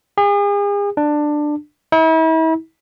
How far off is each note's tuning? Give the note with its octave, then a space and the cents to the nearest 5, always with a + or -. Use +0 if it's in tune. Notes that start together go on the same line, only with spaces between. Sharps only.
G#4 -40
D4 +15
E4 -40